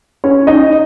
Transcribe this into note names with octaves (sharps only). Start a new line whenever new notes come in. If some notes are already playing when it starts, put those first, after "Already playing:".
C#4 C#5
D#4 D#5